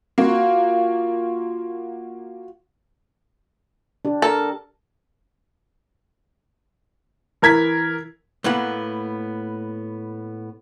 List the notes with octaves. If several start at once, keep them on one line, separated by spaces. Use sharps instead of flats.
A#3 F4 F#4
D4 G4
A4 A#4
E3 A#4 G#6 B6
A2 A#3 B3 F#5